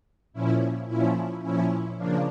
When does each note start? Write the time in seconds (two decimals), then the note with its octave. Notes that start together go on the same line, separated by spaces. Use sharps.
0.33 A#2 F3 C#4 E4
0.87 A#2 F3 C#4 E4
1.42 A#2 F3 C#4 E4
1.97 C#3 F3 A#3 D4